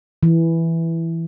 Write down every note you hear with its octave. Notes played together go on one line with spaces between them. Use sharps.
E3